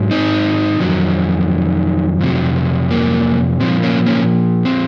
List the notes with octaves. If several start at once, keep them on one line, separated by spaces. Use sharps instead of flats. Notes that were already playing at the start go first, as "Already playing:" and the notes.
Already playing: G#2 F#3
C4 D#4
F2 D#3 F#3
F2 C3 F#3
A#3
A#2 F3 C4
A#3 C#4
A#3 C#4
C4